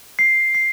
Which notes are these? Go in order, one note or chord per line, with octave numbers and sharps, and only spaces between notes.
C7
C7